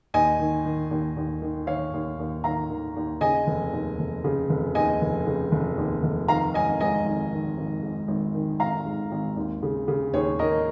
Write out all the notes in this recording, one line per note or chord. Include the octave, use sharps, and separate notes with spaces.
D#2 D#5 G#5
D#3
D#3
D#2
D#2
D#3
D#3 C#5 F5
D#2
D#2
D#3 F5 A#5
D#3
D#2
C#3 D#5 G#5
F1
D#2
F1
C#3
F1
D#2 D#5 G#5
F1
C#3
F1
D#2
F1
D#3 F5 A#5
G#1 D#5 G#5
G#2 D#5 G#5
G#1
D#3
G#1
G#2
G#1
D#3
G#1 F5 A#5
G#2
G#1
D#2
C#3
C#3
D#2 G#4 C#5
D#2 A#4 D#5